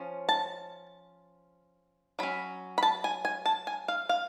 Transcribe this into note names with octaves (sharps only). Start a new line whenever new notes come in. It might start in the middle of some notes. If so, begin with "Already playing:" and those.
Already playing: F3 C#4
A5
F#3 C#4 B5
B5
A5
G#5
G#5
A5
G#5
F5
F5